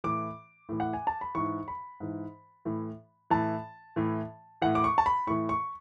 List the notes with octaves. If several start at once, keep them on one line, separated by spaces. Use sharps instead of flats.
A2 E3 D6
A2 E3
F#5
G#5
A5
B5
G#2 E3 C#6
B5
G#2 E3
A2 E3
A2 E3 A5
A2 E3
A2 E3 F#5
D6
C#6
A5
B5
A2 E3 C#6
C#6